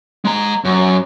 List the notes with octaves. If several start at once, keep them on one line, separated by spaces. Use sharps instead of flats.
G#3 A#5
F#2